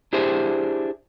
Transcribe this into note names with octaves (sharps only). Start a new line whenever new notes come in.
D4 E4 G4 G#4 C5 E5